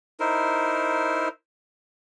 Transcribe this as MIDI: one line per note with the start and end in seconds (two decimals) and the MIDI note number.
0.20 1.28 63
0.20 1.28 64
0.20 1.28 70
0.20 1.28 72